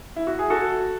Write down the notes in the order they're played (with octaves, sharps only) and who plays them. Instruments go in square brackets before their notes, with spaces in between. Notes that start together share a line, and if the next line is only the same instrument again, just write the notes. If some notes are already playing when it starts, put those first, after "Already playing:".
[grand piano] E4
F#4
G#4
F#4 A4